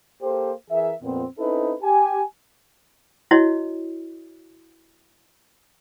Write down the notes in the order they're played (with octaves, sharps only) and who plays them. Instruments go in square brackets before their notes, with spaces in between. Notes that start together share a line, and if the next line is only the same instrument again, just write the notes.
[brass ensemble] A#3 G4 A4 C5
E3 G#4 A#4 E5
F2 A#2 B3 C4
C4 C#4 D#4 E4 A4 B4
G4 G#5
[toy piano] E4 F#4 C#5 D#5